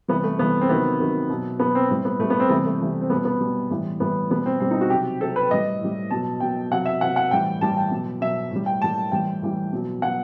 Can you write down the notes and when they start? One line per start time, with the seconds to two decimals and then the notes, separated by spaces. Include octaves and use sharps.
0.08 C3 E3 G3 B3
0.24 A3
0.39 C3 E3 G3 B3
0.61 C4
0.69 C3 D#3 F#3 B3
1.00 C3 D#3 F#3
1.29 B2 F#3
1.59 B2 B3
1.63 F#3
1.75 C4
1.89 A2 G3 C4
2.05 B3
2.19 A2 A3
2.24 G3
2.30 B3
2.40 C4
2.49 C3 E3 G3 B3
2.65 A3
2.80 C3 E3 G3
3.02 C4
3.10 G3 B3
3.13 B2
3.25 B3
3.41 B2 G3
3.70 A2 E3 G3
4.00 A2 E3 G3 B3
4.30 B2 G3 B3
4.46 C4
4.60 B2 G3 C4
4.71 D#4
4.81 F#4
4.90 C3 F#3 G4
5.21 C3 F#3 A4
5.36 B4
5.51 A2 G3 D#5
5.81 A2 G3
6.11 B2 F#3 A5
6.40 B2 F#3 G5
6.71 C3 F#3 F#5
6.85 E5
7.01 C3 F#3 F#5
7.16 F#5
7.31 A2 E3 G3 G5
7.61 A2 E3 G3 A5
7.77 G5
7.91 B2 F#3
8.21 B2 F#3 E5
8.51 A2 G3
8.66 G5
8.81 A2 G3 A5
9.12 A2 E3 G3 G5
9.42 A2 E3 G3
9.73 B2 F#3
10.02 B2 F#3 F#5